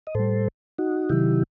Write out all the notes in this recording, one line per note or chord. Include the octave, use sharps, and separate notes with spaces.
D#5
A2 G3 A4 C5
D#4 F#4
C3 D#3 F#3 E4 G4